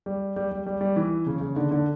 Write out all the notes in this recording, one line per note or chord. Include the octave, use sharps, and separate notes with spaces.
G3
G3
G3
G3
G3
E3
C#3
C#3
D3
D3